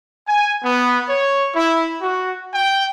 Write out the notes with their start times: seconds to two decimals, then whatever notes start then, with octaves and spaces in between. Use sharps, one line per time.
0.27 G#5
0.63 B3
1.08 C#5
1.55 E4
2.02 F#4
2.53 G5